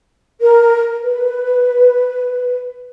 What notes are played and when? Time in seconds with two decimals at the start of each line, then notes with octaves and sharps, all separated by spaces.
0.40 A#4
1.02 B4